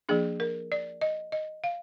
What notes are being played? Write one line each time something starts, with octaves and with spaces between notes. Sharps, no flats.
F3 A#3 D4 G#4
A#4
D5
D#5
D#5
F5